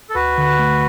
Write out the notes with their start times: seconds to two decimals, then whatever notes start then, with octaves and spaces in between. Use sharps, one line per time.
0.09 A4
0.15 D2 F#4 B4
0.38 D3
0.59 A3